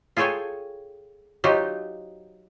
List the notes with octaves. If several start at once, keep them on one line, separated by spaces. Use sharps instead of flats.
F4 G#4 A4 C#5 G5 G#5
F#3 D#4 F4 G4 C5